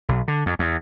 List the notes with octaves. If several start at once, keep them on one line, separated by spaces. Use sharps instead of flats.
B1
D3
F2
E2